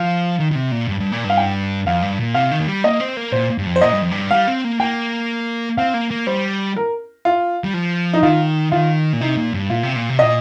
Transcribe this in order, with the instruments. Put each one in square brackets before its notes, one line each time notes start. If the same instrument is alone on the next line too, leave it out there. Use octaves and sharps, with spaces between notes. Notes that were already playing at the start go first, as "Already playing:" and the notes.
Already playing: [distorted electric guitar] F3 [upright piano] F5
[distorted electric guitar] D#3
D#3
C3
A#2
G2
G2
A#2
G2
[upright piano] F5
G5
[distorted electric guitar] F2 [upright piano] F5
[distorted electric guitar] G2
A#2
[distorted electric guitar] C3 [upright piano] F5
[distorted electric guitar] D#3
A#3
G3
[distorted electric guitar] A#3 [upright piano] D#5
[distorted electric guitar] C4
A#3
[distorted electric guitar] A#2 [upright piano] C5
[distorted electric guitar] G2
F2
[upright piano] C5
[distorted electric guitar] A#2 [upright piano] D#5
[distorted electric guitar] G2
F2
G2
[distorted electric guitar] G3 [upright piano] F5
[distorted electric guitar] C4
A#3
[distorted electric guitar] A#3 [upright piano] G5
[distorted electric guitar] C4 [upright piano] F5
[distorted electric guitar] A#3
A#3
[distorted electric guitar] G3 [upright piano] C5
[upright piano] A#4
F4
[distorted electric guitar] G3
F3
[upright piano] D#4
[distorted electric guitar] D#3 [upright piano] F4
[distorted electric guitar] D#3 [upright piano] F4
[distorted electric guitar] A#2
[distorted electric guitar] C3 [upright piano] D#4
[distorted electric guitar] A#2
G2
[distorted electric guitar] A#2 [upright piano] F4
[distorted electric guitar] C3
A#2
C3
[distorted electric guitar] A#2 [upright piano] D#5